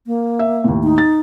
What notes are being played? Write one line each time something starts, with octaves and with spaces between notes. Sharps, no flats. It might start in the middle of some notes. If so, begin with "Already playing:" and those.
A#3
E5
D#2 A2
D#4
A6